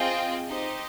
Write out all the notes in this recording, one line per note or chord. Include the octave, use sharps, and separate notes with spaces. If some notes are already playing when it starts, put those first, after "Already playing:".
Already playing: C4 F4 G#4 D#5 G5
D#4 G4 C5 D#5